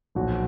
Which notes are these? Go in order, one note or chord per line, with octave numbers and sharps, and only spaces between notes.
B1 A#2 F3 F#4